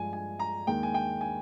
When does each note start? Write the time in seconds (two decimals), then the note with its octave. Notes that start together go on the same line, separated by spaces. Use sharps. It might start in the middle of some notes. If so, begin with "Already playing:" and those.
Already playing: G2 F3 G#3 G#5
0.13 G#5
0.39 A#5
0.67 D#2 D#3 G#3 G5
0.83 G#5
0.94 G5
1.21 G#5